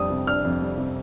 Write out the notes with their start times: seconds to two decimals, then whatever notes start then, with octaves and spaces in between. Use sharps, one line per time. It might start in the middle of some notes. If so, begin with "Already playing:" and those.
Already playing: F2 G3 D4 D#6
0.10 C3
0.27 D4 F6
0.45 F2
0.61 G3
0.78 C3